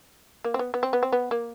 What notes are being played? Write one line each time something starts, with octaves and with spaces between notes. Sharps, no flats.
A#3
C4
B3
B3
C4
B3
C4
B3
A#3